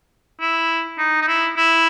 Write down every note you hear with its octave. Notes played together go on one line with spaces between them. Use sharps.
E4
D#4
D#4
E4
E4